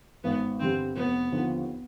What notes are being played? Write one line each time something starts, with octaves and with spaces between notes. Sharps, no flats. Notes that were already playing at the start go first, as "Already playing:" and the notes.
G#1 B3
G2 D3 G3 C4
F1 B3
D#2 D3 F3